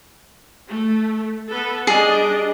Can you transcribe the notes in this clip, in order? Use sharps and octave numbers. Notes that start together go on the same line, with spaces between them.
A3
B3 A4 B4
G3 D4 G#4 D#5